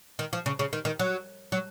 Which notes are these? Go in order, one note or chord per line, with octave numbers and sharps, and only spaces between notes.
D#3
F3
C#3
C#3
D#3
D#3
F#3
F#3